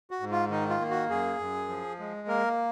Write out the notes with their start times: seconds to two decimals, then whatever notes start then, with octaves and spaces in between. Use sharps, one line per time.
0.11 F#4
0.20 G#2
0.31 F4
0.50 D#3 D#4
0.70 F4
0.80 A#3
0.90 F#4
1.09 F#2 G#4
1.39 F#2
1.69 F3
1.99 G#3
2.28 A#3 A#4